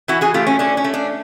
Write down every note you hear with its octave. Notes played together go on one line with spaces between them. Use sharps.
E3 E4 F#4
F#4 G#4
A3 F4 G4
C#4
C#4 D4
C#4
A3
D4